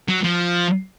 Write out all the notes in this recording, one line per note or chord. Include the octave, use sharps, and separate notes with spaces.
F#3
F3